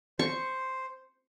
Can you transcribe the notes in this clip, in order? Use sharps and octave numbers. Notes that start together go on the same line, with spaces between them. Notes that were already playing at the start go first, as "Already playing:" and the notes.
C5 C#6